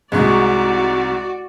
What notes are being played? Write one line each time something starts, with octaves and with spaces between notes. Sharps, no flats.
C2 G#2 G#3 F#4 D5 C#6